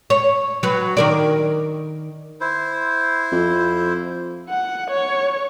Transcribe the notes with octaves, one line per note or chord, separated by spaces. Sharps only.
C#5
F#3 B4
D#3 A#4 D5
E4 C5
F2
F#5
C#5